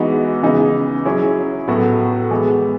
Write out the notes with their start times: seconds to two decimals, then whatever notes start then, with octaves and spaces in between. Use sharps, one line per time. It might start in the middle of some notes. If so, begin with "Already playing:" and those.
Already playing: E3 G#3 B3 D#4 F#4
0.42 C#3 E3 B3 D#4 G#4
1.05 F#3 C#4 E4 G#4
1.68 A2 F#3 B3 F#4
2.31 E3 G#3 B3